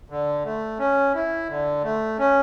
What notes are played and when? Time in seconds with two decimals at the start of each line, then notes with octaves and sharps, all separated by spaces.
0.10 D3
0.45 A3
0.79 C#4
1.14 E4
1.49 D3
1.83 A3
2.19 C#4